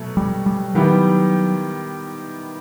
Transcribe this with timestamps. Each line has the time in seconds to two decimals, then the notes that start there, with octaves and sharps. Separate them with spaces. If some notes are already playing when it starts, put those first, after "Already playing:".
Already playing: B2 F#3 A3
0.17 G3
0.46 G3
0.75 D#3 F#3 G3 B3 E4 G4